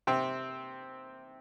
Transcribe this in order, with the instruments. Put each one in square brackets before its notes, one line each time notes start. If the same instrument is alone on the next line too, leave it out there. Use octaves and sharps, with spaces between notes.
[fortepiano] C3 C4